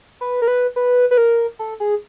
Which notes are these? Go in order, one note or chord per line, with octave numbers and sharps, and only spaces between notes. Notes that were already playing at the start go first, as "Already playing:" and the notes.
B4
A#4
B4
B4
B4
A#4
A4
G#4